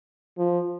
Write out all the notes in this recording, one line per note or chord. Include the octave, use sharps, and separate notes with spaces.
F3